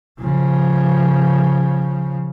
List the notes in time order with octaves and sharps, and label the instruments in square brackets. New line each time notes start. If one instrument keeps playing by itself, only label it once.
[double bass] C#3 F3